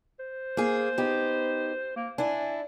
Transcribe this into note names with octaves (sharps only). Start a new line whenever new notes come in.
C5
A#3 G#4
B3 D#4 G4
A#3
D4 E4 G#5